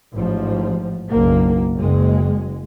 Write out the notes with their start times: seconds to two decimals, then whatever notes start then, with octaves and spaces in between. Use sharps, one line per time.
0.13 A1 G#2 F3
1.09 F#1 B1 A#3
1.79 F#1 G#3